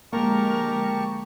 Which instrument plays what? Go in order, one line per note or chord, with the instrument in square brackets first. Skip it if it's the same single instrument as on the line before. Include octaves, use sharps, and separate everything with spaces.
[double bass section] D3 F3 G#3 [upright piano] A#3 [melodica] G4 A5 C#6 [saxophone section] A#4